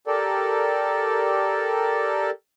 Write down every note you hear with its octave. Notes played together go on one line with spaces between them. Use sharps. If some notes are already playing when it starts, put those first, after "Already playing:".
G4 A4 A#4 D5